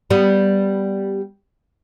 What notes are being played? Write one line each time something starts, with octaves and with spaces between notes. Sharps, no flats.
G3 B3